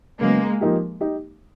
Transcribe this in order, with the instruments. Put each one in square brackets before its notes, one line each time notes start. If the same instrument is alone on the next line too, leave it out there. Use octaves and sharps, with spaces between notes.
[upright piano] C#3 F#3 B3 [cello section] G#3 A#3
[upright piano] F3 A#3 D#4 G4
D#4 G4